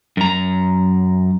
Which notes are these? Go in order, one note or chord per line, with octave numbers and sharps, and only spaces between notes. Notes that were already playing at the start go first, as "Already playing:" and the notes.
F#2 A#5